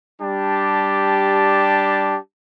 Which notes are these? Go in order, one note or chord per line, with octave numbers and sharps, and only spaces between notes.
G3 D4 G4 A5